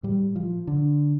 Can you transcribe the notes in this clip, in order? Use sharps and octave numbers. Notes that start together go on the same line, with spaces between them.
A2 G3
F3
D3